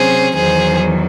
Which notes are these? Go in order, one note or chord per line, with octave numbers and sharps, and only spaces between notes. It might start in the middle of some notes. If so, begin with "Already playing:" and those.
Already playing: C3 F#3 C#4 G#4 C5
E2 D#3 F#3 G#4 C5